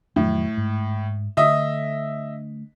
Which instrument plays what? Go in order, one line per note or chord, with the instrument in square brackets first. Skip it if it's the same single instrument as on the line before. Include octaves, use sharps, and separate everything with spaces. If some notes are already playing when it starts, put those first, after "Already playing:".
[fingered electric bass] F2 D#3 F#3 [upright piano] A2
[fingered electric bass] G#2
[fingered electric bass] D3 A3 [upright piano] D#5 E5 D#6